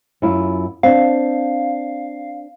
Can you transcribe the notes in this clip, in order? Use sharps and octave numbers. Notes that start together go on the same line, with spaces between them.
F#2 E4 F4
C4 D4 F5